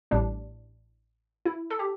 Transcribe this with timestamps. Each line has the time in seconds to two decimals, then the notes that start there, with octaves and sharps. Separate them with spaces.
0.11 A1 A2 G3 D4
1.45 E4
1.70 A4
1.79 G4